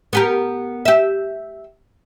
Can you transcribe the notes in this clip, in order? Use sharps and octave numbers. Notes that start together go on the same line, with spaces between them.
B3 G4 A#4
G4 E5